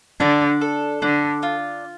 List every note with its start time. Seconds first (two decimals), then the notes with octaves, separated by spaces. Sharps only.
0.20 D3 D4
0.61 A4
1.02 D3 D4
1.43 F4